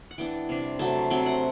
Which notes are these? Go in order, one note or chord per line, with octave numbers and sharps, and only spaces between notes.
F#5
E3 B3 D4 G5
C3 G3 D4
C3 F#3 A3 A5
C3 F#3 C4 G5
F#5